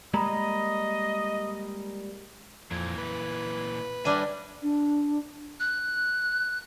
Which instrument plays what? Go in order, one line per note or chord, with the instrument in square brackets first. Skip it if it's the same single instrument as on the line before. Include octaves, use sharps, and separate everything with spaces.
[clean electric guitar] G3 G#3 A#3 [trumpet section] D#5 [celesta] A#5 B5
[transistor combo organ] F2 [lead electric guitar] A#2 E3
[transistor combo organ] B4
[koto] G3 D4 G#5 [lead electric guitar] C#5 E5
[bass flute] D4
[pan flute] F#6